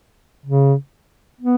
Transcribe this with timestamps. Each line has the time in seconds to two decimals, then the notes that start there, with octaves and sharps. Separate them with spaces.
0.46 C#3
1.41 B3